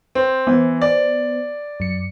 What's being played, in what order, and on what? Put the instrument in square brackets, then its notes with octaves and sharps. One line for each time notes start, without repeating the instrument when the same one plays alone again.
[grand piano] C4
[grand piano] E3 [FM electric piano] B3 C5
[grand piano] D5
[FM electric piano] F#2 C#7